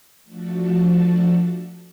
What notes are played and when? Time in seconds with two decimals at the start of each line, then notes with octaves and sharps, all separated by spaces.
0.24 F3 A3 D4 F#4 A4